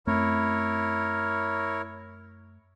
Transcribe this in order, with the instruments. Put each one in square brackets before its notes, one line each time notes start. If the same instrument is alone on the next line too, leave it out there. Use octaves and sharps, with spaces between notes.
[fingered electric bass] F#2 A3 C4 [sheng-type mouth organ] E4 A#4 C#5